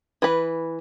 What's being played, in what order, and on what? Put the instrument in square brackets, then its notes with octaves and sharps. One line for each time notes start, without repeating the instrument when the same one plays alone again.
[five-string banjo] E3 B4